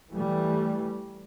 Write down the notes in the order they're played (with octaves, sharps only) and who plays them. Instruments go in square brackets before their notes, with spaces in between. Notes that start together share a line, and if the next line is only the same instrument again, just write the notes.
[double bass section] E3 G3 A3